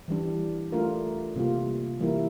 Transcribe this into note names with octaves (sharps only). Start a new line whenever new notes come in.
E3 G3 D4
A3 D4 F4 A#4
C3 G3 A#3 F4
E3 G3 A#3 E4 A#4